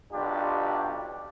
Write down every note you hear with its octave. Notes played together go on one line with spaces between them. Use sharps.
B1 D4 F4 G4